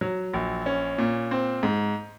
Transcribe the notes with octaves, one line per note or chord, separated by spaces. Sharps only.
F#3
A#1
C#4
A#2
C4
G#2